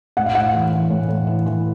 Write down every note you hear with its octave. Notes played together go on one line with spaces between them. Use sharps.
A2 F#5
F5
A2 F#5
E3
E3
A2
A2
E3
E3